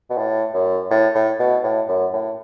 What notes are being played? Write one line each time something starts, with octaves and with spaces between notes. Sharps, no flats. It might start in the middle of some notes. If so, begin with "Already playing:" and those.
B2
A2
F#2
A2
A2
B2
A2
F#2
A2